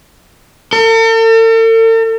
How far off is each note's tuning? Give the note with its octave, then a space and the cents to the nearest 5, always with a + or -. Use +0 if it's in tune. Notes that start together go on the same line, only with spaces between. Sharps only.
A4 +45